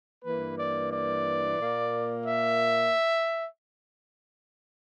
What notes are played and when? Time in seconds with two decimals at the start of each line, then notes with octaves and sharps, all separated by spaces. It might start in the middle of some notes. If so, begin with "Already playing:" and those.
0.25 G2 E3 A#3 B4
0.58 D5
0.92 D5
1.59 A#2 A#3
2.26 E5